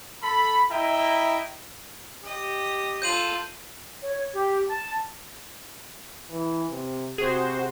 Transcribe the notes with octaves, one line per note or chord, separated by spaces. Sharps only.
A4 B5
E4 D#5 E5 G5 A#5
G4 D#5
F4 A4 G6 D#7 F#7
C#5
G4
A5
E3
C3
C3 F#4 G#4 C5